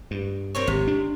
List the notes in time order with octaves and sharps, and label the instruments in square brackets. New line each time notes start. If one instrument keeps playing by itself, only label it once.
[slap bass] G2
[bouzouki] C4 A#4 C#5
[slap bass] G#1 [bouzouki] C3
[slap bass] D4